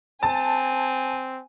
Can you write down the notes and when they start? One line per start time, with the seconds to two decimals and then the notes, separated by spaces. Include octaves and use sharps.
0.23 C4 G#5 A5